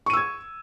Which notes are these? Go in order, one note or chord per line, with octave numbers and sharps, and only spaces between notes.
C#6 E6 G#6 D#7